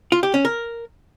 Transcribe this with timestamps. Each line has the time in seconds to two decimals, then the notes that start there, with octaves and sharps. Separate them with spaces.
0.12 F4
0.23 G4
0.34 C#4
0.45 A#4